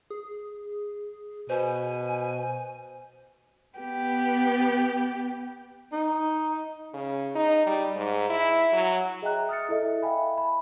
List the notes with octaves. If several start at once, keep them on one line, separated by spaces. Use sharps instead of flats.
G#4
B2 C5 G#5
B3 G4
D#4
C#3
D#4
G3
G#2
E4
F#3
G#4 D#5 E5 G5 A#5 F#6
D#6 F6 A6 C#7
E4 A4 D#5 E5
E5 F5 G5 G#5 B5
B5